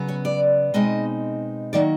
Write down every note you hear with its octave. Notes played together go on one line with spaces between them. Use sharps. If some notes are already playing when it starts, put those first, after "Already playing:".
Already playing: C#3 F#3 B3
C#5
D5
B2 G#3 C4 D#4 D#5
D#3 F#3 A#3 D5